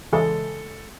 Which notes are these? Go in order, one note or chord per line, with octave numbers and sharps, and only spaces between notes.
C#3 E3 G#3 A4